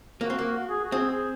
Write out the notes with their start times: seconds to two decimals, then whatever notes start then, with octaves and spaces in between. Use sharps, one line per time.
0.21 A#3 F#4
0.30 C4
0.39 A#3
0.45 F#4
0.57 F#4
0.69 G#4
0.84 F#4
0.92 C4 G#4
1.10 G#4